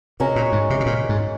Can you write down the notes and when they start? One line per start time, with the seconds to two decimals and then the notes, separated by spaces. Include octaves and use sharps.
0.20 C3 G#3 C#4 F#4 A#4
0.36 A#2
0.52 G#2
0.70 C3
0.80 C3
0.86 A#2
1.09 G#2